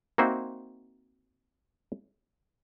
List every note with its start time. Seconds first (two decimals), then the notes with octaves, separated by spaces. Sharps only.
0.18 A#3 C4 D#4 F#4 C5 E5